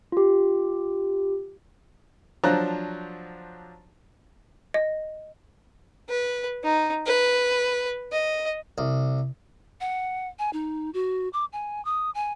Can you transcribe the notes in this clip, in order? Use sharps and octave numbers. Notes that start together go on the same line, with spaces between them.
F4 G4
F3 F#3 D4 C5 A#5 F#6
D#5
B4
D#4
B4
D#5
C2
F#5
G#5
D#4
F#4
D6
G#5
D#6
G#5